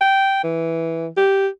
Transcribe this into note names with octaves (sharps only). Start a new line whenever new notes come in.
G5
E3
G4